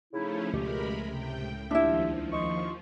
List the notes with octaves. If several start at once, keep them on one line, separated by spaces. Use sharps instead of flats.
C#3 F3 A3 C#4 D#4 E4
C#2 B2 G#3 A3 G4 A#4 B5
A2 C3 G5
D#2 F3 D4 E4 F4 G4 E5
D#5 C6 C#6